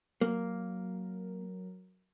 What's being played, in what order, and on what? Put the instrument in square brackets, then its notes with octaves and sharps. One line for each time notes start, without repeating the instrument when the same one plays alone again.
[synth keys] F#3 A#4 [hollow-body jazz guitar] A#3